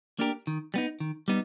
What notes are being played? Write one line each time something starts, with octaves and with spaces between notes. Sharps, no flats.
A#3 D4 G4 A#4
D#3
G3 B3 D#4
D#3
G3 B3 D#4